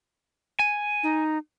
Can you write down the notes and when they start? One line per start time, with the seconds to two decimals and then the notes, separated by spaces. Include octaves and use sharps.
0.59 G#5
1.03 D#4